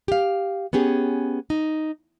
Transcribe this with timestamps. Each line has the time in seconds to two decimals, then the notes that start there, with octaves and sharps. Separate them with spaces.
0.08 G4 F5
0.73 B3 C#4 G4 G#4
1.50 D#4